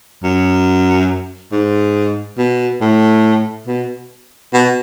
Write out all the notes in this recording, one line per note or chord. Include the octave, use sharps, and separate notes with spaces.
F#2
G#2
B2
A2
B2
B2